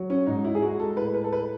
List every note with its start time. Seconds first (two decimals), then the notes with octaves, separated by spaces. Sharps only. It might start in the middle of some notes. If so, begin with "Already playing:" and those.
Already playing: F#3
0.10 C#4
0.27 G#2 D#4
0.44 E4
0.55 G#4
0.62 G#3 F#4
0.80 A4
0.97 A2 B4
1.14 B4
1.24 A4
1.32 B4